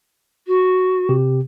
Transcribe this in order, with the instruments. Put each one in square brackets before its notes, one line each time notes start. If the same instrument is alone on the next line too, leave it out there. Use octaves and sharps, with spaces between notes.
[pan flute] F#4
[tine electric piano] C3 G4